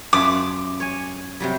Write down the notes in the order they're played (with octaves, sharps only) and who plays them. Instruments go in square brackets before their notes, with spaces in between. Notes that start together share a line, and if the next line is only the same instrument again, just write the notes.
[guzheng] F#2 F4 E5 [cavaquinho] D6
[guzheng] C#5 G#5
C3 F#3 G3